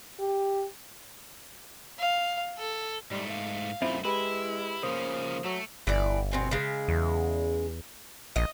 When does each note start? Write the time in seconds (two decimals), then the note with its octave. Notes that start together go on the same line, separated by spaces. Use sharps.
0.19 G4
1.99 F5
2.58 A4
3.11 G#2 G3 A3
3.30 F5
3.82 F#2 A3 C4 E4 F4
4.05 G#3 E4 G4 B4
4.83 C#3 F3 A#3 C#4 C5 D#6
5.44 F#3 A3
5.87 G1 E3 D5
6.32 B2 C4 G#5
6.51 C#3 G#3
6.88 E2
8.36 A#1 D#5